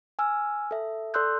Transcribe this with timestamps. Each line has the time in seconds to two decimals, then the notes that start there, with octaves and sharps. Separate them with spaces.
0.19 G#5 E6 F6
0.71 A4 E5
1.14 A4 D5 C6 E6 F#6 G6